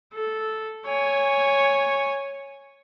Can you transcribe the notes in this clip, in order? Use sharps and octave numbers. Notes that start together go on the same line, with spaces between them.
A4
C#5 G#5